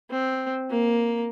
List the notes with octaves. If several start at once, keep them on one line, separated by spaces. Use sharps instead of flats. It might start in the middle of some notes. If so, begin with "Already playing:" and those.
C4
A#3